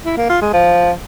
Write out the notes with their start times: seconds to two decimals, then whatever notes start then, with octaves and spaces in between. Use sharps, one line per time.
0.06 E4
0.17 A#3
0.29 F4
0.41 G#3
0.53 F3